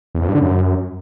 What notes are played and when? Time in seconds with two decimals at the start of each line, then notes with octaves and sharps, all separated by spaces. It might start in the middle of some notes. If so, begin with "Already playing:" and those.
0.15 E2
0.21 F2
0.28 G2
0.35 D3
0.41 F#2